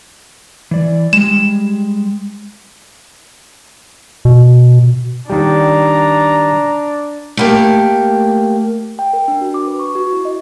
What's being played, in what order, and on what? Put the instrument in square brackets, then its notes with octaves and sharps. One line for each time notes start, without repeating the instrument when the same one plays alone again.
[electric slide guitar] E3 D5
[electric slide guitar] G3 G#3 [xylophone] E7
[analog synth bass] B2
[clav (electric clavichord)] D#3 G3 [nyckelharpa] D4 [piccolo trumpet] A#5
[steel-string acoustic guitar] A3 A#3 G4
[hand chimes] G5
A#4
D4
F#4
D6
B4
C#6
F#4
E4
D#5